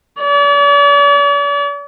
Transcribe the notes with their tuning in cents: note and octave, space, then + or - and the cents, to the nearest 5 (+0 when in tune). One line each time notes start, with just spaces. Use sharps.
D5 -45